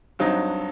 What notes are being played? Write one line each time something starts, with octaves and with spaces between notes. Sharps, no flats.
G2 F#3 C4 D#4